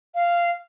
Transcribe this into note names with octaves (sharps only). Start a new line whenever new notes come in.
F5